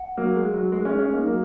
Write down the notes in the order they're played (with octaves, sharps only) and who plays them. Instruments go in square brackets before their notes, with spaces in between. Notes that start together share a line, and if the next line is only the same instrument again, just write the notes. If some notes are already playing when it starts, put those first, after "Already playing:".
Already playing: [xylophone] F#5
[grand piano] F#3 A#3
G#3
F#3
G#3
G#3 C#4
G#3 C#4
A#3 D#4
F#3 A#3